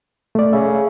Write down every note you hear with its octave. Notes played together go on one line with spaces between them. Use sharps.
A3 D5
C#3 E5